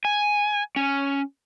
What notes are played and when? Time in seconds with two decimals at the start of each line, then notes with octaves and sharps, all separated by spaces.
0.05 G#5
0.76 C#4